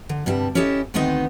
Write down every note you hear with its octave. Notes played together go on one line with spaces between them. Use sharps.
D3
G2 C3 G3 A5
C#4 E4 G4 A4 D#5
D2 D#3 B3 C4 D#4 D#5